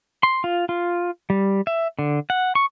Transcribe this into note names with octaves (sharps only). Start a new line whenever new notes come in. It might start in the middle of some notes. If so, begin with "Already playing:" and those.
C6
F4
F4
G3
E5
D3
F#5
C#6